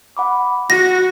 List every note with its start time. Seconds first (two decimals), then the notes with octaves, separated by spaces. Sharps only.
0.17 F#5 B5 D6
0.70 F#4 F#5 A#6